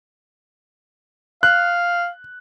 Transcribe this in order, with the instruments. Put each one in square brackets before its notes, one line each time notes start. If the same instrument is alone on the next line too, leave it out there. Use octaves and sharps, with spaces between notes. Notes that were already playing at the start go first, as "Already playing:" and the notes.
[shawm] F5 [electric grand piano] F#6